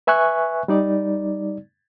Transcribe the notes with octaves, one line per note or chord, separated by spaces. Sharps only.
B4 E5 G#5 C#6 F#6
G3 D#4 D5